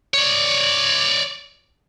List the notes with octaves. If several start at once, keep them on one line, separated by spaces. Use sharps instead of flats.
C#5 D5